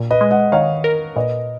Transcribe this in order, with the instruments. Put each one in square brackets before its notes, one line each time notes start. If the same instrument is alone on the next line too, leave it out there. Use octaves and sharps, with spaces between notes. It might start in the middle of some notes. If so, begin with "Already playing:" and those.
Already playing: [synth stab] A#2
[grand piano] B4 D#5
[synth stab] G#3
[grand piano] D#5 F#5
[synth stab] D#3 [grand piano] C#5 F5
[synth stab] A#4
[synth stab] A#2 [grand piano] B4 D#5